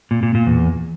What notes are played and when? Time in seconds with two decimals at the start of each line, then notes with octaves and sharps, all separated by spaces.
0.11 A#2
0.23 A#2
0.35 A#2
0.47 E2